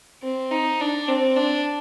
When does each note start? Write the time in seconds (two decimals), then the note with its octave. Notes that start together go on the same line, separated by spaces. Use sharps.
0.23 C4
0.51 D#4
0.81 D4
1.08 C4
1.36 D4